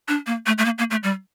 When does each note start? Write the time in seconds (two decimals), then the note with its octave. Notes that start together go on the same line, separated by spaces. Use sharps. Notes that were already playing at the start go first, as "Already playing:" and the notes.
0.08 D4
0.27 A#3
0.46 A3
0.58 A3
0.65 A#3
0.78 A#3
0.91 A3
1.03 G3